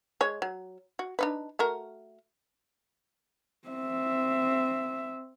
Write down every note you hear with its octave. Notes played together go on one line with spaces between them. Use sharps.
G#3 C#5
F#3
F#4
D4 D#4 B4
A3 F#4 A#4
C4 E5